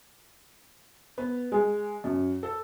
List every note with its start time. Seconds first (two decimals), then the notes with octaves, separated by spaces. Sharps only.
1.18 B3
1.52 G#3
2.04 F#2
2.43 A4